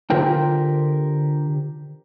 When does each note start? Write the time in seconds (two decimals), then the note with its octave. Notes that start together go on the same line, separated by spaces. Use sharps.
0.10 D3 F4 G4 A#4 C5 G5